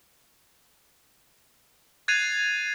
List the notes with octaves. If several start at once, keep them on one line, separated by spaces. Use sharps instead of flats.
F#6 G#6 A6 C7 D#7 F7